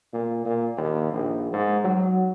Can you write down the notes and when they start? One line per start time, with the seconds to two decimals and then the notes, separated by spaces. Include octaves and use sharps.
0.13 A#2
0.46 A#2
0.77 D#2
1.12 A#1
1.53 G#2
1.84 F#3